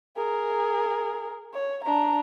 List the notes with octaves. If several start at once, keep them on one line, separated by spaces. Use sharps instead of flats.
G#4 A#4
C#5
D4 A#5